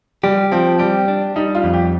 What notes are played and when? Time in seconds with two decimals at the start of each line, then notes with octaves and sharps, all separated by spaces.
0.24 G3 G4
0.52 F3 C4
0.79 G3 G4
1.08 D4
1.36 G3 D#4
1.55 F4
1.64 F2
1.73 G4